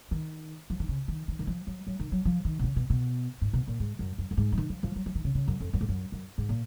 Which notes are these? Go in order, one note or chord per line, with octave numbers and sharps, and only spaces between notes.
D#3
F3
D#3
C#3
D#3
D#3
D#3
F3
F#3
F#3
D#3
F#3
F3
D#3
B2
C#3
B2
B2
G#2
B2
A#2
G#2
F#2
F#2
F#2
G#2
F3
D#3
F3
F3
F#3
F3
D#3
C#3
C#3
F#2
F2
F#2
G#2
F#2
F#2
G#2
A#2